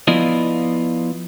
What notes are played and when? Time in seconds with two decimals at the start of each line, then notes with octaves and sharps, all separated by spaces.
0.07 F3 B3 E4 F4 D5 D#5